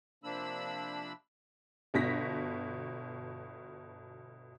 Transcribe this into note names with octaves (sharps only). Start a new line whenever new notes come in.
C3 F3 A#3 D4 B5 E6
G1 B2 A#6 B6